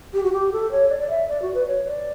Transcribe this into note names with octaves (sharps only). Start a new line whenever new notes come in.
G4
F#4
G4
A4
C#5
D5
D5
E5
D5
F#4
B4
C#5
D5